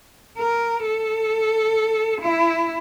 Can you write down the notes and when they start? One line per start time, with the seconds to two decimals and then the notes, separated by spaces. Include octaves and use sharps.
0.38 A#4
0.85 A4
2.21 E4